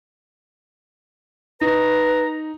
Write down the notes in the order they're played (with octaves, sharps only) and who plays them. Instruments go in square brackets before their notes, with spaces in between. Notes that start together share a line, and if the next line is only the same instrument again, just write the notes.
[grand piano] D#4 [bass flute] B4 [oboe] A#5